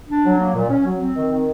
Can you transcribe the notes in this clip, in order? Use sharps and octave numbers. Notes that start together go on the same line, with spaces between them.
D4
F#3
A#3
A#2
C#4
F#3
C4
D#3
D#3